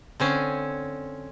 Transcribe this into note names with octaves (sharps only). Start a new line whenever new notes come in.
D3 C4 C#4